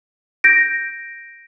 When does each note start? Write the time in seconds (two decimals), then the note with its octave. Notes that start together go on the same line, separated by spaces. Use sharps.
0.44 G6 A#6 D7